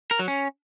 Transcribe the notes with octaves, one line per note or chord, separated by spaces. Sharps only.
A#4
F#3
C#4